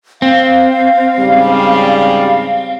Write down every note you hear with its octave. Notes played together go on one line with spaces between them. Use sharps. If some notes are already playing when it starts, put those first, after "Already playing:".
C4 F5
G#2 C#3 G3